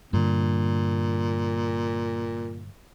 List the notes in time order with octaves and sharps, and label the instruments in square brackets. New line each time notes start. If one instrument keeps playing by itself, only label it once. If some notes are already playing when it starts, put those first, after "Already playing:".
[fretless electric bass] G2 D3 [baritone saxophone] A#2